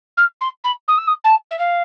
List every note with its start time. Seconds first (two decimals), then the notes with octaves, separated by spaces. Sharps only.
0.17 F6
0.41 C6
0.64 B5
0.88 D#6
0.98 E6
1.07 D#6
1.24 A5
1.51 E5
1.59 F5